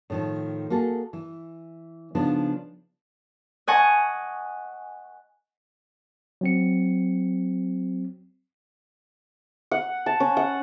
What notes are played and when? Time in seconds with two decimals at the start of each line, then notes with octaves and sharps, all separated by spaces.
0.10 A2 D#3 F3
0.70 A#3 F#4 G#4 A4
1.13 E3
2.15 C#3 F3 B3 D4 D#4
3.68 D#5 F#5 G#5 A5 C#6
6.41 F#3 C4 C#7
9.71 F#5
10.06 A5
10.20 C#4
10.37 F#5